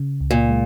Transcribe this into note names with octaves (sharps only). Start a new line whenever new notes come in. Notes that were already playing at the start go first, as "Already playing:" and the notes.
Already playing: C#3
C#2
A#2
G#3